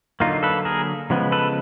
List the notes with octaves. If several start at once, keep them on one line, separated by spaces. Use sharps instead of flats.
D3 F#3 A#3 D#4 F4
A4 B4
G#4 A#4
C#3 F3 G#3 B3
A4 B4